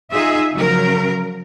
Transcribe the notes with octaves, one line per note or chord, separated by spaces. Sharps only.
D#4 F4 G#4 E5
C#3 F3 F#3 A#4